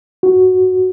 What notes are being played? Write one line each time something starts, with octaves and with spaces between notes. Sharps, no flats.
F#4